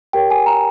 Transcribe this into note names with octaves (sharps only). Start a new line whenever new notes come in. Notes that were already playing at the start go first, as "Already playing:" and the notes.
G4 A#4 C#5 G5
G#5
A#5